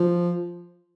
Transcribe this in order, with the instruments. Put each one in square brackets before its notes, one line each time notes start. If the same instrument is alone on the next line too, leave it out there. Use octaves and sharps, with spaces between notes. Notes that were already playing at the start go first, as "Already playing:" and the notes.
Already playing: [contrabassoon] F3